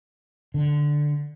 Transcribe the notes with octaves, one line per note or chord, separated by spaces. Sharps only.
D3